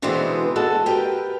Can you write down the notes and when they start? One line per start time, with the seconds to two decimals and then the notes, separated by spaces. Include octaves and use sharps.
0.02 B2 D3 E3 G#3 B3 C4
0.56 G#3 F#4 A4
0.86 G4 A#4 B4 G5